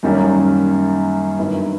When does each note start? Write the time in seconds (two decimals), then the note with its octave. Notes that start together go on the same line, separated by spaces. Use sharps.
0.03 F#2 D#3 G3 A#3 C#4
1.39 G2 D#3 F#3 B3 E4